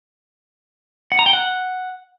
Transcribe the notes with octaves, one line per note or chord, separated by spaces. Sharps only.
F#5
A#5
G5
F#5